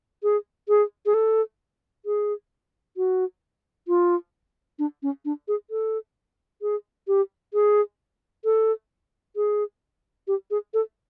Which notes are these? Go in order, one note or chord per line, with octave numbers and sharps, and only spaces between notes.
G#4
G#4
G#4
A4
G#4
F#4
F4
D4
C#4
D4
G#4
A4
G#4
G4
G#4
A4
G#4
G4
G#4
A4